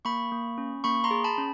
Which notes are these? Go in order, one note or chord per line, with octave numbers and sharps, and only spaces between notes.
A#3 B5 C#6
A#3
C#4
A#3 B5 C#6
A#5 C6
G#4
A5 B5
C#4